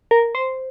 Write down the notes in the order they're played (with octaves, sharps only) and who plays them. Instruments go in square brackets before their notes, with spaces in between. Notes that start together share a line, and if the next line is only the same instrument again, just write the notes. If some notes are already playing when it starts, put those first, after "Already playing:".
[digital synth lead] A#4
C5